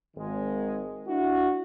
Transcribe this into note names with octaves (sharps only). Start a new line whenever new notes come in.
G#1 D#3 G#3
D4 E4 F#4